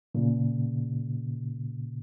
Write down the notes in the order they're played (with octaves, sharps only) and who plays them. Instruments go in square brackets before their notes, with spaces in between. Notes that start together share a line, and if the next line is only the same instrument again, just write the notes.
[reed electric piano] A#2 C#3